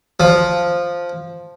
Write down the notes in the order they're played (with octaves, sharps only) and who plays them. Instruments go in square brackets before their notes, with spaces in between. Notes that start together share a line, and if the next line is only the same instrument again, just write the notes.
[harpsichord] F3